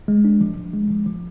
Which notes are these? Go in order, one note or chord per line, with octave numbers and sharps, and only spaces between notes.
G#3
D4
F3
F3
G#3
F3
F3